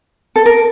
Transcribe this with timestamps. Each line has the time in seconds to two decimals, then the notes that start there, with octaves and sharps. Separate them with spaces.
0.36 A4
0.46 A#4